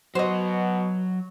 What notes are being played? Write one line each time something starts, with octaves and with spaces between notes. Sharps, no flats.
B2 F#3 F#4 C5 D#5